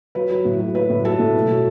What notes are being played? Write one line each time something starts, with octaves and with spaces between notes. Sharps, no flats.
F#3 B4
F#3
A2
F#3
F#3 B4
A2
F#3 A4
A2
B2
F#3